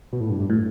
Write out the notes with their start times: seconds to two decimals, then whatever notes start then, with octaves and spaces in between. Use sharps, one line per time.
0.13 B2
0.21 A2
0.30 G2
0.40 G2
0.50 A2